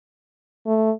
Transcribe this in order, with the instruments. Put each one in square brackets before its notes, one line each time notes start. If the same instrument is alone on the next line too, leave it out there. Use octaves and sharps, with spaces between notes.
[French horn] A3